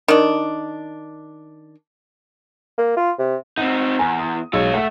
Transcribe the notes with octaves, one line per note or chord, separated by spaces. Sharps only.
D#3 D4
A#3
F4
C3
C4 D#4 F#5
E2 G#5 A#5
D#6
B1 G#3 F4 C#5 E6
A3 E5 F#5